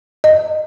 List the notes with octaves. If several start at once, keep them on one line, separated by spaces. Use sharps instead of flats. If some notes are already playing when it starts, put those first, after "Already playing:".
D#5